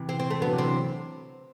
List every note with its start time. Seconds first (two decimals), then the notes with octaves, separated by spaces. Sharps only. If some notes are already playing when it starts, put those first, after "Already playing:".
Already playing: C3 E3
0.09 C4
0.19 C4
0.30 A3
0.41 D3 F#3 B3
0.52 C3 E3
0.58 C4
0.64 D3